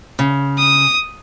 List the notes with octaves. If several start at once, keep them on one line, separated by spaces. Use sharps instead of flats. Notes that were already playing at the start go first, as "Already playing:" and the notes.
C#3
D#6